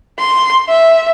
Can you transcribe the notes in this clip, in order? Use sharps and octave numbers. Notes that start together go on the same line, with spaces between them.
C6
E5